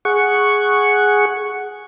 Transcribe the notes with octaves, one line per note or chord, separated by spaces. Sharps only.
G#4 F#5 C#6